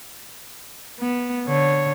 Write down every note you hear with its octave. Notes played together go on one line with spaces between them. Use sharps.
B3
D3 C#5